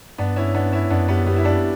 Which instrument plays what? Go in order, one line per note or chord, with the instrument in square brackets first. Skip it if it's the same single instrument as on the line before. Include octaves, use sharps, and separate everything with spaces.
[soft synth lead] G2 [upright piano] B3 D4
[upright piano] C#4 E4
B3 D4
C#4 E4
[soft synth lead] F#2 [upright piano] B3 D4
[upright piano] G3 B3
G3 B3
E4
B3 D4